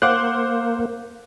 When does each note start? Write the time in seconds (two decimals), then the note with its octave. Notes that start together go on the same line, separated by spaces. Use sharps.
0.02 A#3 C5 F5 F#5 D6 F#6